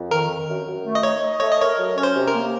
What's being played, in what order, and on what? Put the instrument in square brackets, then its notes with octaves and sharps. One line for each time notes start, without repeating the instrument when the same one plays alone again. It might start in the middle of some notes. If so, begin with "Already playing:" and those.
Already playing: [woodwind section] F2
[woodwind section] D#3 [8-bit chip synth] A#4
[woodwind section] D#3
F#2
F#2
A3
[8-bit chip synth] D#5
[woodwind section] D#4 [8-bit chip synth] C#5
[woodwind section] D#5
[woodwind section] A3 [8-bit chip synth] C#5
[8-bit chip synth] D#5
[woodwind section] A#4 [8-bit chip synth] C#5
[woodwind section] F#3
[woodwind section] C#4 [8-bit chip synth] C#5
[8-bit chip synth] C5
[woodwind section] C3
[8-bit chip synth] A#4
[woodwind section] A#3